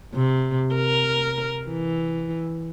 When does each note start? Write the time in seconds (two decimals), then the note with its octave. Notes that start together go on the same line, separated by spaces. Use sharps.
0.14 C3
0.75 A#4
1.68 E3